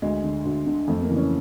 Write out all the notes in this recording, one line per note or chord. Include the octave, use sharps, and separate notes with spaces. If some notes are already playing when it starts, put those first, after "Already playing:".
D2 G#3
D3
D2
D3
F2 A3
A#3
C#3 E3
C#4